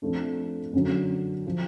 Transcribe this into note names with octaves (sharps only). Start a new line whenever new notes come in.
F2 F3 A3 D4
F#2 D3 F#3
F3